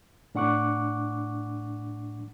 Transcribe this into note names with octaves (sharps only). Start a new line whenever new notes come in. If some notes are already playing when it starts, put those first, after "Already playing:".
A2 D4 F#5 C#6 D6 F#6